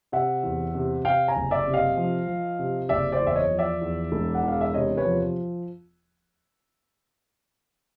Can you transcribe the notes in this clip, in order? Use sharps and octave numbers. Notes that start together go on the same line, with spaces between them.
C3 E5 F#5
E2
C3
C3 F5 G5
G#5 A#5
F#1
D5 E5
C3
D#5 F5
F3
F3
C3
F#1 D5 E5
C5 D5
E2
E5
C#5 D#5
F3
D5 E5
E2
E1
F#5
E2
F5
E5
C3 C#5 D#5
B4 C#5
F3